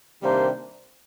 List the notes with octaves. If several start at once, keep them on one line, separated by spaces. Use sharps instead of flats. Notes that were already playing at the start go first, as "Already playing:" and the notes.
C3 D#3 G3 A#3 D4 C5